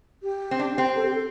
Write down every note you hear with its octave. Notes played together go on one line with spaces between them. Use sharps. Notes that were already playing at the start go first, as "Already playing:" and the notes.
G4
C4
D4
C4
A4
G4
A4